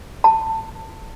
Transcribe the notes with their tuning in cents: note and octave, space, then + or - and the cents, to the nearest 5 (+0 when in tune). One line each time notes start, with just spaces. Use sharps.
A5 +15